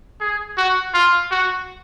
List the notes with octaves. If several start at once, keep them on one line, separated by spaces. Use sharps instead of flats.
G#4
F#4
F4
F#4